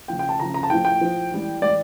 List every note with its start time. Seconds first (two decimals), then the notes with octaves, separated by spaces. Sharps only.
0.08 C#3 F3 G5
0.19 G5
0.29 A5
0.40 C#3 F3 A#5
0.54 A#5
0.63 A5
0.70 A2 F3 G5
0.85 G5
1.00 A2 F3
1.31 A2 E3 G3
1.61 A2 E3 G3 D5